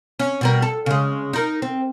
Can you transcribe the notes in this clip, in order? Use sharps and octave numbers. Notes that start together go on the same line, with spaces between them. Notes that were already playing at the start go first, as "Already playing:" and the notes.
C#4
B2 G3 A#4
A4
C#3 G#3
D#4 A#4
C4